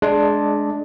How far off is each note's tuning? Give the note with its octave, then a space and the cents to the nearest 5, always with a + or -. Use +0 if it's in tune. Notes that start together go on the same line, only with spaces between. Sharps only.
G#3 +20 D4 +0